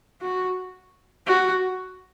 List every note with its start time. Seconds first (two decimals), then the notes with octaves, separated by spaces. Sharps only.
0.22 F#4
1.27 F#4